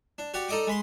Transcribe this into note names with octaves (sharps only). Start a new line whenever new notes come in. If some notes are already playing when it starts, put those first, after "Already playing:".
D4
F#4 G4 D5 F#5
D#4 A4 D5 D#5 D6
G#3 B5 C6